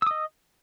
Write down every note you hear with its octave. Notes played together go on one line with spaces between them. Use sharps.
D#5 D#6 E6